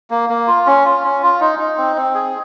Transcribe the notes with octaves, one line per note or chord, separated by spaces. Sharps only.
A#3
A#3
F4
C#4
F4
C#4
F4
D#4
D#4
C4
C4
G#4